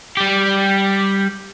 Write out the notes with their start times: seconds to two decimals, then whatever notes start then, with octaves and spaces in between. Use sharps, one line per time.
0.17 G3 G4